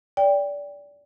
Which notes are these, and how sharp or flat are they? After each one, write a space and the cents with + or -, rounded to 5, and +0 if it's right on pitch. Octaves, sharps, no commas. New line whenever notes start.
D5 -25 G5 +15